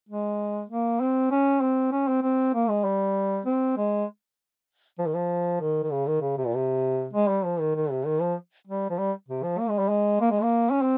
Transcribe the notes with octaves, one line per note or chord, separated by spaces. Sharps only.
G#3
A#3
C4
C#4
C4
C#4
C4
C4
A#3
G#3
G3
C4
G#3
F3
D#3
F3
D#3
D#3
C#3
D#3
C#3
C3
A#2
C3
G#3
G3
F3
D#3
D#3
C3
D#3
F3
G3
F3
G3
C3
F3
A#3
G#3
G3
G#3
A#3
G#3
A#3
C#4
C4